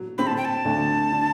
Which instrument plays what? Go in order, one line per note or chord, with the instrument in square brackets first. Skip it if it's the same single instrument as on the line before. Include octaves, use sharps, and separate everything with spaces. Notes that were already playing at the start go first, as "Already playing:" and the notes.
Already playing: [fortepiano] F#3
[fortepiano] C4 [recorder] B5
[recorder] A5
G5
A5
[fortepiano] D2
D3